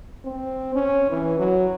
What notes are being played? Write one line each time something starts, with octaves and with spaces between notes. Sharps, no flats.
C4
C#4
E3
F#3